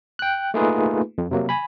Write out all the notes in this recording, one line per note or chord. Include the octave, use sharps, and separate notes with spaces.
G5 F#6
A3 A#3 D#4 F4 G#4 B4
F2
C3 F#3 A#3
G#5 B5